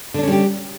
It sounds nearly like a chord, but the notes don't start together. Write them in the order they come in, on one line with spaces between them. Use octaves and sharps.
D3 D4 C#4 G3 G4